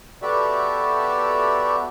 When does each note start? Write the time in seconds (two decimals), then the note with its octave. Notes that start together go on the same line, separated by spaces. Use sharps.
0.22 B3 F#4 G4 A4 D5 E5